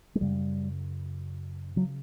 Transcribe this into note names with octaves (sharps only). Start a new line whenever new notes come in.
G#3
F#2 C#3 G3
C#3 F#3